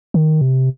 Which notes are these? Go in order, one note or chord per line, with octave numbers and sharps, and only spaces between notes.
D#3
C3